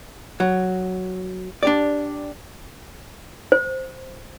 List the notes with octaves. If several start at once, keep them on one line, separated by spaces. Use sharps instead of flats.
F#3
D4 G4 D5
C5